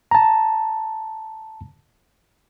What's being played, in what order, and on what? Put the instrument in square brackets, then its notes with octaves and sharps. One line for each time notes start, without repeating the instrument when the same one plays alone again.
[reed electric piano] A5 A#5